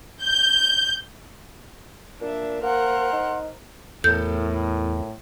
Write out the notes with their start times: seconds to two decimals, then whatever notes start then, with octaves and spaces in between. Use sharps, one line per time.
0.22 G6
2.21 A#2 D4 E5
2.63 A#3 A#4 C5 F#5 C6 F#6
3.12 D#4
4.04 E2 A2 A4 A#4 G6